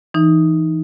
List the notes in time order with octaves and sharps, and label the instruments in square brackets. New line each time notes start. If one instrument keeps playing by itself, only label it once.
[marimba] E3 D#4